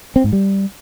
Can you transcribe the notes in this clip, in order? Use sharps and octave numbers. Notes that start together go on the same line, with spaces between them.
C4
G#2
G3